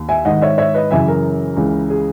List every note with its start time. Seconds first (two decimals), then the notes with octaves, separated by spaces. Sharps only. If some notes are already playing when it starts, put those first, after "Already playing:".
Already playing: D#2
0.09 E5 G#5
0.25 G#2 D#3 D#5 F#5
0.42 C#5 E5
0.58 C#5 E5
0.74 B4 D#5
0.91 F#2 C#3 E3 E5 G#5
1.08 A#4
1.57 C#2 C#3 E3
1.90 G#4